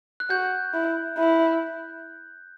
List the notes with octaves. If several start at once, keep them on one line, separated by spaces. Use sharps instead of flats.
F#6
F#4 G6
E4
E4